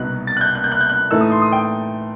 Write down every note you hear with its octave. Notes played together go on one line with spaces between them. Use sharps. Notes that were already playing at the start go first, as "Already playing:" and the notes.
Already playing: C2 B2 F#3 B3 D#4 F#6
A6
F#6
G6
F#6
G6
F#6
G6
F#6
A2 E3 A3 D#4 E6
D#6
C6
D#6
G5